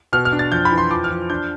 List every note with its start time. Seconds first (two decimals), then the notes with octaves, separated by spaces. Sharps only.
0.13 B2 F6
0.25 F6
0.32 D4
0.39 A6
0.52 F2 G6
0.65 B5
0.71 E3
0.78 C6
0.91 F3 D6
1.04 F6
1.11 F3
1.30 D4 G6